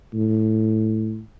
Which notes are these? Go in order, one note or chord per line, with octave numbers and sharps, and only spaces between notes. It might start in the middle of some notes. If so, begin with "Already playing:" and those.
A2